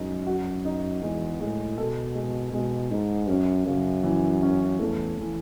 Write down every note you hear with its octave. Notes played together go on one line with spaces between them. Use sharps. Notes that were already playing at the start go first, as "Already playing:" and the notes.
Already playing: F#2 G#3 D#4
F#4
D#4
E2 G#3
A2 G#3
B2 A4
G#3
B2 G#3
G#2 D#4
F#2 C#4
F#2 C#3
E3
C#4
E2 A3
E3